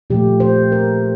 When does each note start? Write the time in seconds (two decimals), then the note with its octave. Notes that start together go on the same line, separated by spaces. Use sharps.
0.10 A#2 F3 A3 G4
0.40 C5
0.72 A#4